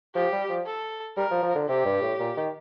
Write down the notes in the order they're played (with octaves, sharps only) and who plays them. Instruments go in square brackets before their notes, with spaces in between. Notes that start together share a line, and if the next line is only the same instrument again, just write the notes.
[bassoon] F3 [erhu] G4
[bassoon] G3
F3
[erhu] A4
[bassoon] G3 [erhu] A#4
[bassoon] F3
F3
D3
[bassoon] C3 [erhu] G4
[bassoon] G2
A2
A#2
D#3